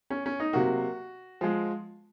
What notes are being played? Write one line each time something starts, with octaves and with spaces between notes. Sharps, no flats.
C#4
C#4
D#4
C3 F#3 A#3 F#4
F3 G#3